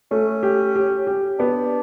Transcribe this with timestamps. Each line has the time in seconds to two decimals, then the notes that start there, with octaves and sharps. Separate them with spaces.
0.11 A3 C#4
0.43 G4
0.76 G4
1.07 G4
1.39 B3 D4